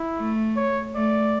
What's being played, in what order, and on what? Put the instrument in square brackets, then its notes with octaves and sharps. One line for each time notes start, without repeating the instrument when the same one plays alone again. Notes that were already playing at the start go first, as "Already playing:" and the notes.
Already playing: [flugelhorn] E4
[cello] A3
[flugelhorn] C#5
[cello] A3 [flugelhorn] D5